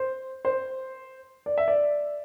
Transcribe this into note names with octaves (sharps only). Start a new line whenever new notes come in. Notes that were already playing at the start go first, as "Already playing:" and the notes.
Already playing: C5
C5
D5
E5
D5